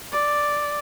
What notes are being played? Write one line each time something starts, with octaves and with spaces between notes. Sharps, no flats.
D5